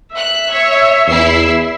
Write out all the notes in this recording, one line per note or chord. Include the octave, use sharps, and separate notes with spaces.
E5 F#6
C#5
E2 E4 E6 C7